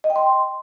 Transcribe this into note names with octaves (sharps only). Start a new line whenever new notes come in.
D#5
G5
C6